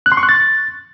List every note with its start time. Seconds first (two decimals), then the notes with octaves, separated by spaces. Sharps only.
0.06 F#6
0.12 C6
0.17 C#6
0.23 F#6
0.29 A6